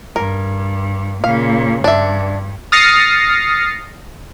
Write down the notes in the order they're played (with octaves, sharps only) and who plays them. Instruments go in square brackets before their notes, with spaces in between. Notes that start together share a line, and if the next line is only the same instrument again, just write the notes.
[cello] G2 [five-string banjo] A#4
[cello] A#2 C#3 [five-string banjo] F5
[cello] G2 [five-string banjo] D4 E5
[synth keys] D#6 F6 A6 A#6 C7 C#7